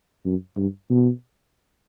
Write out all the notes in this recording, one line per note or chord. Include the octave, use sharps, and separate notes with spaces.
F#2
G2
B2